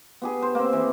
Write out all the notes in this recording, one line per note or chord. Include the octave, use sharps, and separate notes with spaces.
B3 G4 G#4
C5
A#3 C4
E3